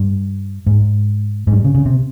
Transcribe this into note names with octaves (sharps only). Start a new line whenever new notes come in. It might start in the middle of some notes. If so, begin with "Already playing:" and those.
Already playing: G2
G#2
G#2
G2
C#3
C#3
C3